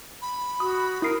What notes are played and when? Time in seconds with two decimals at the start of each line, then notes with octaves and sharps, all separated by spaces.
0.22 B5
0.60 F#4 D#6
1.02 E4 A#4 D#6 C7